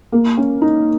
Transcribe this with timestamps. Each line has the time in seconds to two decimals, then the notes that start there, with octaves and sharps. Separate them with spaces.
0.12 A#3
0.37 C#4
0.61 D#4